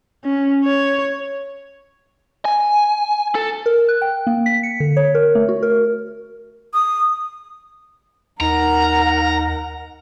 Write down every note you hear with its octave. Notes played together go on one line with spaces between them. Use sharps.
C#4
C#5
G#5
A4
A#4
F#6
G5
A#3
B6
C#7
D3
C#5
A#4
A3
F#4
A#4
D#6
D#2 D#4 A#4 F#5 A#5